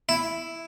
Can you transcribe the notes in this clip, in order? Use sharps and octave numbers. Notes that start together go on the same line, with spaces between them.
E4